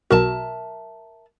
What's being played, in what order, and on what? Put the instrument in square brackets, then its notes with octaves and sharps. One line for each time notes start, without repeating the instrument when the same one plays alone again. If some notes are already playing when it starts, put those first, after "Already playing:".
[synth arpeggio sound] B1 B2 F#4 [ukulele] A#4 E5 A5